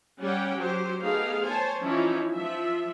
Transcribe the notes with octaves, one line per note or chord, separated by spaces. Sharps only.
G3 C#4 G4 F#5 G5
F#3 G4 C5
A3 B3 D#4 G4 G#4 F5
C5 C#5 G#5 A5
E3 F3 C#4 D#4 E4
F3 E5